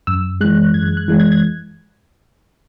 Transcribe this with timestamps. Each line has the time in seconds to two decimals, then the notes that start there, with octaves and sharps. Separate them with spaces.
0.07 F#2 E6
0.41 E3 G#3 F#6
0.74 F#2 G#6
0.97 F#6
1.08 E3 G#3
1.20 G#6
1.32 G#6